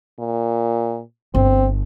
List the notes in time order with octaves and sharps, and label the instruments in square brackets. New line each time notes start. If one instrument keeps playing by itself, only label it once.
[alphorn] A#2
[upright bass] G1 [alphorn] C4